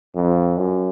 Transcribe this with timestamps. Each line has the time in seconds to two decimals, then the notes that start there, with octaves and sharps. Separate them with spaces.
0.15 F2
0.57 F#2